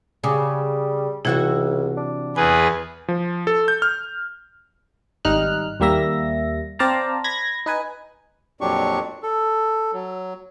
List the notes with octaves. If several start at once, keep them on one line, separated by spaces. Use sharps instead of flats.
C#3 G3 G#5 D6
C#2 C3 E3 E4 F#4 E5
D4
E2 G#4 B4 G#5
F3
A4
G6
F6
G#1 G3 D#4 F6 F#6
D#2 G3 A#3 E5 A#6
C4 C5 D5 F5 A5 A#5
B5 G#6 A#6
D#4 B4 G#5
F2 A#2 F#3 D4 G4 C#6
A4
F#3